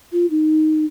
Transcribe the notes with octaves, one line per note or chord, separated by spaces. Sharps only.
F4
D#4